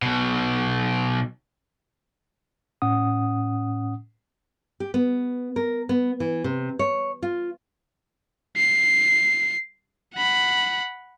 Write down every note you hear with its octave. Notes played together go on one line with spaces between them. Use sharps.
B1 B2
A2 C#4 F#5 D#6
G4
B3
A#4
B3
E3
C3
C#5
F4
C7
F#5 B5